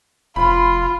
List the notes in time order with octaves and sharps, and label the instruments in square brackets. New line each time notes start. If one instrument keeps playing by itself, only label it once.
[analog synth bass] F1 [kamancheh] F4 [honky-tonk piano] B5